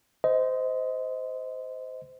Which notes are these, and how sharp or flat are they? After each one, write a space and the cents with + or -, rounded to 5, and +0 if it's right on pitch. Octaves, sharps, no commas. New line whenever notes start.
C5 -20 D#5 +20